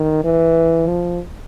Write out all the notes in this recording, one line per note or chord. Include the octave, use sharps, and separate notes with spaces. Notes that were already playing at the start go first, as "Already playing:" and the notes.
Already playing: D#3
E3
F3